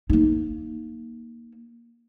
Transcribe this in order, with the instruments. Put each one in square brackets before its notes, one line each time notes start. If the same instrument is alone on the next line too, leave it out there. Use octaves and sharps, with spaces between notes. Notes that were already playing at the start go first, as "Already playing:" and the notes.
[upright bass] A#3 D#4